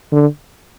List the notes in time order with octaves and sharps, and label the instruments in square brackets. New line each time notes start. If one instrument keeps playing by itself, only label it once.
[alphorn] D3